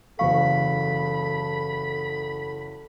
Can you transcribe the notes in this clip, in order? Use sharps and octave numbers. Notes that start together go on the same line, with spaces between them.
F#1 E2 A4 F5 B5 C#6